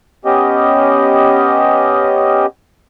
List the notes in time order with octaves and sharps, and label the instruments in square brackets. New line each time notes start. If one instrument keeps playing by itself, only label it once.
[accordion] B3 C#4 G4 D#5